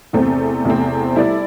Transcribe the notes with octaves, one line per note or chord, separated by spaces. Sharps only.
E2 C3 A3 C4
E2 C3 A3 C4
G3 E4 A4 D5